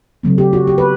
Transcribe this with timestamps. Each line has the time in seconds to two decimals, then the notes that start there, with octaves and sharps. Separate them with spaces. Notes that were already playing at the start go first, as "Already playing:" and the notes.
0.23 C#3 F#3 A3 C4
0.38 G4
0.53 F#4
0.67 G4
0.78 B4